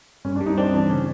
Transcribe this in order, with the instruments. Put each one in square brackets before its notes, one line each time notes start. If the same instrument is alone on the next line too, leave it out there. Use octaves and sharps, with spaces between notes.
[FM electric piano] G2 [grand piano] C#4
[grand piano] D4
[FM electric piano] G3
[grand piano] D#4
[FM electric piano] C4 [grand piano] D4
[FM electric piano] E3 [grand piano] D4
[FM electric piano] C#3 [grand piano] C#4